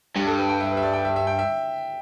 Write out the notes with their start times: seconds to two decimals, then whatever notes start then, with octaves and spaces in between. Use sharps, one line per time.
0.16 G2 G4
0.27 A4
0.38 B4
0.49 G5
0.60 E5
0.71 B4
0.77 E5
0.83 D5
0.93 G5
1.05 E5
1.16 E5
1.27 G5
1.39 E5